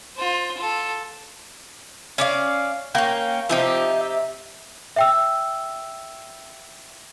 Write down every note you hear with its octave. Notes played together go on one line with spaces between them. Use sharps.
F4 C5
F4 A4
C#4 D5 F5
A#3 C#4 G5
C3 F3 D#4 G4
E5
E5 G5 E6